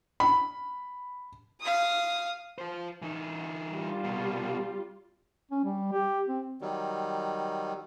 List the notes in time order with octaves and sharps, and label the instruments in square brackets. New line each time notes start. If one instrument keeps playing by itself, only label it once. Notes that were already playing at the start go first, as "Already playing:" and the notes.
[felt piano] B5
[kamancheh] F5 D#6
[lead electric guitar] F4 C5
E3 D#4
[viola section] G3 F4
[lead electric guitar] C2 B2
[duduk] C#4
G3
G4
C4
[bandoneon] D#3 F#3 G3